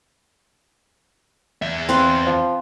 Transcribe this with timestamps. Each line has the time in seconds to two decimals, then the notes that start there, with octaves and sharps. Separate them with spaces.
1.62 E2 E5
1.89 C4 B4 F5
2.27 F3